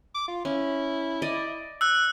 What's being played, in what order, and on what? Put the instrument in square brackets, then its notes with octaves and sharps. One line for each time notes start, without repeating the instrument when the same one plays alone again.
[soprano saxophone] D6
F4
[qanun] C#4 [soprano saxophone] E4
[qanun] D5 D#5
[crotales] E6 F#6